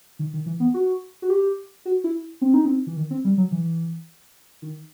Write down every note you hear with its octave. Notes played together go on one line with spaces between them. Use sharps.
D#3
D#3
E3
B3
F#4
F#4
G4
F#4
E4
C4
D#4
C4
E3
D#3
C4
G3
F#3
E3
D#3